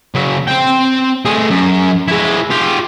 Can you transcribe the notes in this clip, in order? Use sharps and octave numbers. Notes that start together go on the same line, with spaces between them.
C#3 F#3
C4 G5
A3 G#4
F#2
G#3 E4
F4 G4